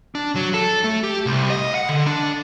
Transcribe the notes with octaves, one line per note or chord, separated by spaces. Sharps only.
D4
F#3
A4
A3
G4
C2
D#5
F#5
D3
D4